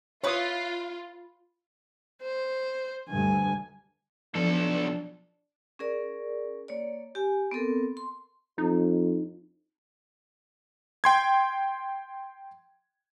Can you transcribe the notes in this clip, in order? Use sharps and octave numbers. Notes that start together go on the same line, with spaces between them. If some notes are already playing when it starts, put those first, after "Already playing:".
E4 F4 B4 C#5 D#6
C5
D2 G2 G#5
B1 F3 D4 A4
C#4 G#4 A#4 D5
A#3 C#5 D5
G4 G#5
B3 C4 A4 A#4
C6
F2 D#4
G5 C6 G#6